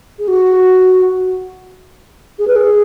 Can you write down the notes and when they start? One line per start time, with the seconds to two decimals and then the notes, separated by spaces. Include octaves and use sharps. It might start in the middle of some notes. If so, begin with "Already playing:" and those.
0.19 G#4
0.28 F#4
2.39 G#4
2.48 B4
2.56 G#4